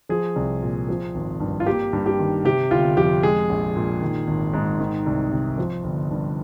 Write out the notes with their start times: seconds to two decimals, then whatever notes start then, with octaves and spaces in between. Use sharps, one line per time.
0.09 F3 G#4
0.36 C2
0.62 A#2
0.89 F3
1.15 G#1
1.40 G2
1.60 F4
1.66 A#3 G4
1.93 G2
2.06 G4
2.19 D#3
2.45 C3 G4
2.70 G1 F4
2.97 F2 G4
3.23 G#3 G#4
3.49 A#1
3.76 A#2
4.01 D#3
4.27 G#1
4.53 G#2
4.80 D#3
5.06 C2
5.31 C3
5.58 F3
5.84 G1
6.11 G2